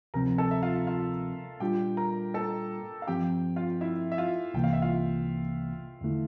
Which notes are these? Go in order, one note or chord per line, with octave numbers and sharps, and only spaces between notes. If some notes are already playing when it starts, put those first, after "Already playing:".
D2 C3 F3 C4 A#4 A#5
A4 A5
E5
F4 F5
F4 F5
A#2 G3 D4 F4 G4 G5
A#4 A#5
A4 A5
F5
G2 F3 C4 G4 G5
F4 F5
E4 E5
E5
F4 F5
C2 C3 E3 A#3 G5
F5
E5
F4 F5
E2 D3 A3 E4